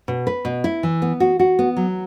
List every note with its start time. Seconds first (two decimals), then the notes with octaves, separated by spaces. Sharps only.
0.08 B2
0.27 B4
0.45 B2
0.64 E4
0.83 E3
1.02 B3
1.20 F#4
1.39 F#4
1.59 B3
1.77 F#3